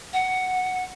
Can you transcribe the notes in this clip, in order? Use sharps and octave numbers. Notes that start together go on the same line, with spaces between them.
F#5